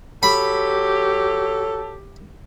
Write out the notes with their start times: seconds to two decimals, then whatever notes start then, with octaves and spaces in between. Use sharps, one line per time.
0.23 F#3 G4 A4 B5